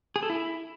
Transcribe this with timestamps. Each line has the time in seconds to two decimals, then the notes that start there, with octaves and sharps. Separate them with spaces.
0.16 G#4
0.23 A4
0.30 E4